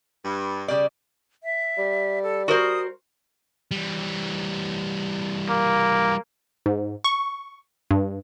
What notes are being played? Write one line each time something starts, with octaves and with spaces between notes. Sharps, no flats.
G2
C#3 G3 D5
E5
G3
A4
F#4 A#4 C5 D#6
E3 G3
A#3
G#2
C#6
G2